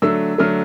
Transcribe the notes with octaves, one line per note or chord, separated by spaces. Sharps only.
D3 F#3 A3 E6
D3 F#3 A3 F6